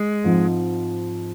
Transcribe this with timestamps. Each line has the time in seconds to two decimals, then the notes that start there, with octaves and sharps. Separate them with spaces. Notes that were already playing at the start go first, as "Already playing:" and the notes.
Already playing: G#3
0.24 G#2 F3 C4 D#4